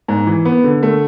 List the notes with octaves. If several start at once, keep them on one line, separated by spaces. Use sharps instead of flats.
G#2
E3
B3
D3
A3